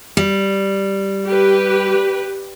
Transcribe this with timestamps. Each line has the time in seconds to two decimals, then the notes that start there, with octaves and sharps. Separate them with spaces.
0.17 G3
1.26 G4 B4